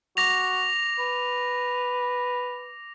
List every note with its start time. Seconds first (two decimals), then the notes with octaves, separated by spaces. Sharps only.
0.17 F#4 D6 A#6 F7
0.99 B4